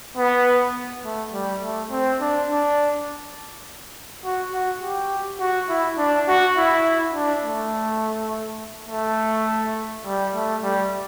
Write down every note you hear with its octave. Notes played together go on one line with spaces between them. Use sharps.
B3
A3
G3
A3
C4
D4
D4
F#4
F#4
G4
F#4
E4
D4
F#4
E4
D4
A3
A3
G3
A3
G3